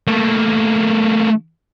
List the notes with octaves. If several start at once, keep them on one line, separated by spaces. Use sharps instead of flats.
A3 A#3